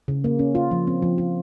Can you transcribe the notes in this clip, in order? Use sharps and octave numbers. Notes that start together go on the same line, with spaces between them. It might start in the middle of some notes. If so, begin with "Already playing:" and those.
C#3
A#3
C#4
F4
F3
C4
F3
F4